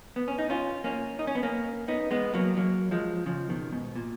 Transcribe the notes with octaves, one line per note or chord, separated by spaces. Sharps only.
B3
C#4
D#4
C#4 F4
A#3 C#4
D#4
C#4
B3
A#3 C#4
B3 D#4
G#3 B3
F#3 A#3
F#3 A#3
F3 G#3
C#3 F3
B2 D#3
G#2 B2
A#2